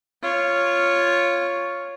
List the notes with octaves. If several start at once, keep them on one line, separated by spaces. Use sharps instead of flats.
F4 C#5